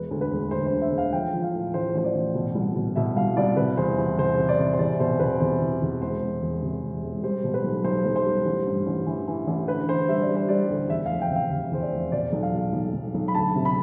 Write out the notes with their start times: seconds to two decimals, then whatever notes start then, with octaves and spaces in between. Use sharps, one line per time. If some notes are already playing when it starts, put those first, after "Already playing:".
Already playing: E1 B4
0.11 D2
0.21 B4
0.31 E1
0.51 D2 C5
0.66 C5
0.72 D3
0.82 E5
0.92 E1
0.98 F5
1.13 F3 G5
1.34 F3
1.44 F5
1.53 A2
1.74 A1 C5
1.95 A1 C5
2.04 D5
2.15 A1
2.35 B2
2.55 C2
2.76 B2
2.96 B2 E5
3.16 C2 F5
3.37 C2 D5
3.56 C3 B4
3.77 E2 C5
3.98 E2
4.18 C3 C5
4.38 C3
4.49 D5
4.59 C3
4.73 C5
4.79 E2 D5
5.00 B2 C5
5.19 E2 B4
5.40 E2 C5
5.61 E2
5.81 E2
6.02 E1 C5
6.22 E1
6.42 E1
6.62 C3
6.83 E1
7.03 E1
7.23 G3 C5
7.44 B2
7.54 B4
7.64 B1
7.84 B1 C5
8.06 B1
8.16 C5
8.26 G3
8.45 A1
8.67 G2
8.86 A1
9.06 E3
9.28 E3
9.47 A1
9.68 D3 B4
9.88 D3 C5
10.08 G3 E5
10.22 D5
10.29 G3
10.35 C5
10.49 G3 D5
10.70 D2
10.90 E2 E5
11.06 F1 F5
11.21 G5
11.30 C3
11.36 F5
11.51 C3
11.71 E2 C5
11.81 D5
11.92 F1
12.12 B2 D5
12.33 B1
12.43 F5
12.54 B2
12.73 B1
12.94 B1
13.15 B1
13.28 B5
13.35 D2 A5
13.55 C3
13.65 B5